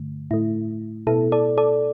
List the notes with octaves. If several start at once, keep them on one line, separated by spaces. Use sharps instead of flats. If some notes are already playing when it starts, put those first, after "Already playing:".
Already playing: G2 D3 A3
A2 A3 E4
B2 B3 E4 A4
A4 D5
A4 D5